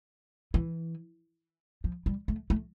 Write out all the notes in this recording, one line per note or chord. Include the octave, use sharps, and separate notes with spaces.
E3
F3
G3
A3
A3